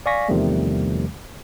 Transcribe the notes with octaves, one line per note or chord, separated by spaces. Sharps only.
D5 F5 G#5 C#6 A#6 B6
E2 C3 D#3 F3 G3 A3